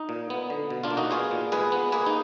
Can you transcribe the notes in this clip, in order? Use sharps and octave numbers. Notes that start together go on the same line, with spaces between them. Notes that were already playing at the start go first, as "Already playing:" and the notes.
Already playing: D#4
A#2
B3
D3
B2
D4 F4
A#3
D#4 F#4
B3 F4 G#4
A#2
G#3 G#4 B4
B3
A#3 G#4 B4
D#4